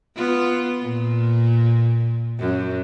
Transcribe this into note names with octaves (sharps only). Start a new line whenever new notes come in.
B3 F4
A#2
F#2